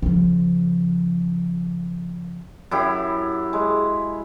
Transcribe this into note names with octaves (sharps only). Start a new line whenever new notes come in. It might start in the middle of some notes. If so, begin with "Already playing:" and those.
C#3 F3
F#2 E4 G4 B5
G#3